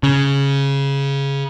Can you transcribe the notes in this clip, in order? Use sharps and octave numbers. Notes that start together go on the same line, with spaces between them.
C#3